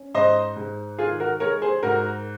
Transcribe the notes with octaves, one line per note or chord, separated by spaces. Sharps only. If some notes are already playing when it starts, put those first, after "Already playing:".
Already playing: C#4
G#2 C5 D#5
G#2
D#3 F4 G#4
F#4 A#4
G#3 A#4 C#5
G#4 C5
G#2 F#4 A#4